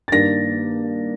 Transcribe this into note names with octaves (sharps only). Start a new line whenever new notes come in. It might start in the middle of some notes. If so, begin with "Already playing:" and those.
A6
G2 D#3 A#3 D4 A#6